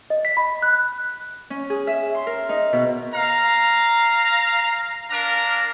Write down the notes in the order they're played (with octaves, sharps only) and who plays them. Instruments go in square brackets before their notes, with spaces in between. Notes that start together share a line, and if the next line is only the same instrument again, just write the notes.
[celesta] D#5
B6
B5
F#6
[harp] C#4
G#4
E5
C6
A#4
D#4
B2
[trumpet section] F5 A#5
D4 A#4 F5 A#5